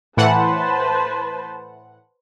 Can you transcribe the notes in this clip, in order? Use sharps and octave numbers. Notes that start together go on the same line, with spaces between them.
A2 E3 B4 C5 F#5 A5